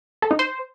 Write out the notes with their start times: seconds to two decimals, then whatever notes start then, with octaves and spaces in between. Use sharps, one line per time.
0.22 A4
0.31 D#4
0.39 C5